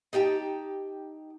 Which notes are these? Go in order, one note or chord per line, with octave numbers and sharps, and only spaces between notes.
D#4 G4 G5 A5